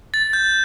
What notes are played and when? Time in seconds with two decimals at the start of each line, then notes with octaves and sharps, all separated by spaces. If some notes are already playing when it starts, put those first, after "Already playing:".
0.14 A6
0.33 G6